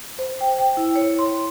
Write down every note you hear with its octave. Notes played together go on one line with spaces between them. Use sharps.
C5
G5
G5
E4
C#5
C6